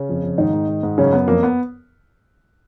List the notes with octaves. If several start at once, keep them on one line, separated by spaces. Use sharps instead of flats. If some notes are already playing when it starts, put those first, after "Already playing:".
Already playing: C#3 C#4
F2
F2
G#2 D#3 D#4
G#2
G#2
G#2
F#2 C#3 C#4
F#2 B3
F2 A#3
B3